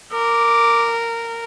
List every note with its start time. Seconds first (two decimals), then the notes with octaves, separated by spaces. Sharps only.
0.13 A#4 D6